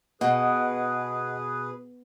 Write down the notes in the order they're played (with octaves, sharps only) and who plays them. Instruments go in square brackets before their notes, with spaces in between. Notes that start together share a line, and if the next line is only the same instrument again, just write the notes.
[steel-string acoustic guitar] B2 [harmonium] G#4 B4 [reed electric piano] D#5 F#5